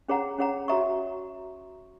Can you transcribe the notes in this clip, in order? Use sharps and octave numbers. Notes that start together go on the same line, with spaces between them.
C#4 G#4 C#5 F#5 A#5
C#4 G#4 C#5 F#5 A#5
F#4 C#5 E5 A#5 C#6